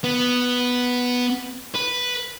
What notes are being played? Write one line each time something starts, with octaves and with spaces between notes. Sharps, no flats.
B3
B4